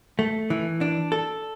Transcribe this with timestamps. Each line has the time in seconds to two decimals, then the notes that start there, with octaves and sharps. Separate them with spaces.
0.19 A3
0.50 E3
0.81 D4
1.12 A4